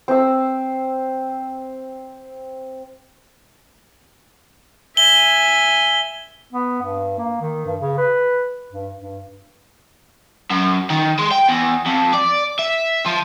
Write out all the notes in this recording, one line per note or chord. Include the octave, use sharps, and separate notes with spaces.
C4 E6
E5 G#5 G7
B3
G2
A#3
D#3
G2
C#3
B4
G2
G2
F#2
D#3
G#3
G5
E2
F2
D5
E5
F3